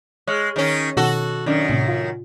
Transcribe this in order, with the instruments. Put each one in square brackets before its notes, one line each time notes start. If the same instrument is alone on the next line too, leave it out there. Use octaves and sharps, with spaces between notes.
[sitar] G#3 [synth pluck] C#5 C#6 F6
[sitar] D#3 C#4
[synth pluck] B2 D#3 [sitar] F#4 A4
[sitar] F#2 D#3 [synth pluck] C#4 D4 D5
[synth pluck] A2 C3
F4